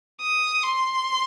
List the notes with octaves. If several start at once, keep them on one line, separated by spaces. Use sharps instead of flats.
D#6
C6